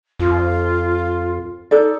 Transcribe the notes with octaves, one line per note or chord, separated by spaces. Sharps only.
F2 F4
D#4 A4 D5